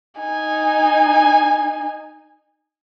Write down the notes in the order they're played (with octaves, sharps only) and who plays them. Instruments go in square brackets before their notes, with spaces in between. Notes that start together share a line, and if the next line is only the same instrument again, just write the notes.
[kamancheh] D#4 G#5